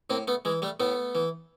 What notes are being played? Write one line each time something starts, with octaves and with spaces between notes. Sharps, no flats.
A2 A#3 C4
A3 B3
E3 G#3
G3 A3
A2 A3 B3
E3